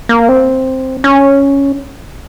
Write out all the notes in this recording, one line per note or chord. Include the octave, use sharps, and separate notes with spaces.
A#3
C4
C#4